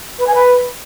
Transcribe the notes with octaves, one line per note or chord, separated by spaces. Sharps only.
B4
G#5
B4